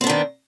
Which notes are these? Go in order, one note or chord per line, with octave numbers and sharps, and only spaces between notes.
D#3 B3 C4 D4